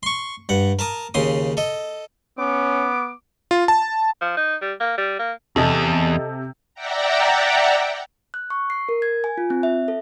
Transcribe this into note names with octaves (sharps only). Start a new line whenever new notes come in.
C6 C#6
G2 F#5
A#4 A5 A#5 D#6
D#2 C#3 C6 D#6
A4 D#5
B3 C#4 D6
F4
A5
F3
D#4
G3
A#3
G3
A#3
E2 C3 A4 D#5 A5
D5 E5 F#5 G5 A#5
F#6
C#6
C7
A#4
G#6
G#5
F4
C4
E5
A4